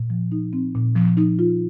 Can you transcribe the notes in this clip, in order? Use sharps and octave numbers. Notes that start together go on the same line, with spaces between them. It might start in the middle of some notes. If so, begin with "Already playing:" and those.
Already playing: A#2
F3
D#4
C4
A#2
F3
D#4
F4